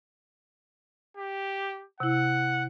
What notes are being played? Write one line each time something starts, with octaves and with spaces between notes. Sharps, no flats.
G4
C3 E4 F#5